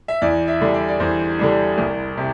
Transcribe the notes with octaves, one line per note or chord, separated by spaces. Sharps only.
E5
E2 D5
E5
D3 G3 D4
D5
D5
E2 C5
D3 G3 D4
C2
C3